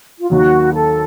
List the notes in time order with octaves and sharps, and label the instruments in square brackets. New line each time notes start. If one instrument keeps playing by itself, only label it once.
[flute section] F4
[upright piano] D#2 D#3 F#3 [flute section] F#4
[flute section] A4